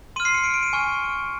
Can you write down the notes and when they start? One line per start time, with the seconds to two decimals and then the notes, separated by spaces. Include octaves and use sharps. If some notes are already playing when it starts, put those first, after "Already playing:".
0.16 C6 F6 D#7
0.25 C7
0.35 C#7
0.44 D7
0.54 D7
0.63 D#7
0.73 G#5 C#6 F6